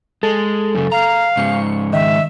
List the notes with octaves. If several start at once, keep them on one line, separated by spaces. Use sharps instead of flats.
G#3 A4
F#2 C#3
F5 A#5
G#2 C#3 C#7
D#3 E5